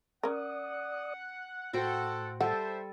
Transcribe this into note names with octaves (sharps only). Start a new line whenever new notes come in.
C#4 A#4 D5 F#5 D#6
A2 F#4 A4 C5 F#5 G5
G3 A4 C5 E5 F#5